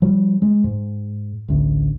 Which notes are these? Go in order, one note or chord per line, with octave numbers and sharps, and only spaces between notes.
F3 G3
G#3
G#2
A1 D2